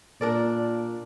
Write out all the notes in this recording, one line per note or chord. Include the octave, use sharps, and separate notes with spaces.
A#2 D4 A#4 D5